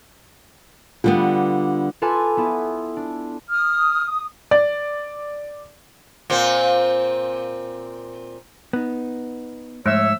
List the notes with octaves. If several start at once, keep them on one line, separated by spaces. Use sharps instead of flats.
D3 G3 B3 F4
F4 A4 B4 G#5 D6
B3 E4
D4
D#6 F6
D5
A#2 C4
B3 D#4
G#2 F3 G#3 A3 C#5 E5 E6